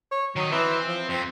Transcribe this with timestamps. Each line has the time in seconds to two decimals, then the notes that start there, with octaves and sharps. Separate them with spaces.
0.11 C#5
0.36 D#3 F#3 D#5
0.51 E3 C4
0.87 F3
1.09 F2 C4